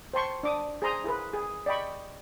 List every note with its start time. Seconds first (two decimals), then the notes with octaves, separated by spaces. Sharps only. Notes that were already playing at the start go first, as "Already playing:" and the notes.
0.14 C5 G5 A5 C6 C#6
0.43 D4 D6 D#6
0.82 G#4 C5 A#5 C6 D#6
1.04 E4 G#4 A#4 B4
1.34 G#4
1.66 D5 D#5 G5 B5 C#6